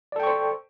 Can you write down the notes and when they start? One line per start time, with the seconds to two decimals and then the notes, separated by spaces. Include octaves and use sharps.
0.12 D5
0.16 A4
0.20 G5
0.23 C#6
0.27 C5